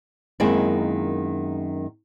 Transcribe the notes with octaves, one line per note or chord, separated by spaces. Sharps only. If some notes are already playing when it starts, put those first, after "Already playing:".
F#2 D#3 G#3 A#3 C4 E4